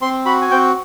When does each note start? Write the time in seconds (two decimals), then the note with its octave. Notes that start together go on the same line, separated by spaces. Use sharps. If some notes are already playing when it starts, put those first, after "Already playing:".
0.01 C4 C6
0.26 F#4 B5
0.41 G#5
0.51 C4 G5